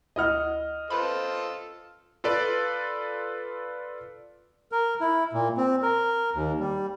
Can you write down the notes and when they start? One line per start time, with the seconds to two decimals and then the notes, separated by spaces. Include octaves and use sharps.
0.16 D2 E4 D#5 F#5 F6
0.90 F4 A4 B4 C5 A5 B5
2.24 F4 A4 B4 D5
4.72 A#4
5.01 E4
5.33 A#2
5.57 C4
5.83 A#4
6.35 D#2
6.60 G3